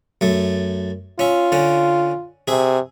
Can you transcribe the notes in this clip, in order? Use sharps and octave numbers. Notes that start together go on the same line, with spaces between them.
F#2 A3
C#4 F4 E5
D3 C#4
C3 G#4 E5